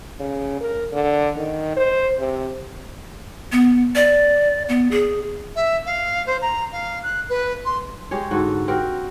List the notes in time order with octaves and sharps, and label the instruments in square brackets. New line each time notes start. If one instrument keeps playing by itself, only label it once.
[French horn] C#3
A#4
D3
D#3
C5
C3
[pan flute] B3
D5
B3
G#4
[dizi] E5
F5
C5
A#5
F5
F#6
B4
C6
[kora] G#3 G4 G#4 C#5
G#2 D3 F#4 A4
C4 F#4 G4 A#4